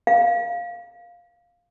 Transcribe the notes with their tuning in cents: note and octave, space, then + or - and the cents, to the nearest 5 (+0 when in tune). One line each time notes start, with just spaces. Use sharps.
F5 +5